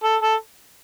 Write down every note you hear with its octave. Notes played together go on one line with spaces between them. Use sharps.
A4
A4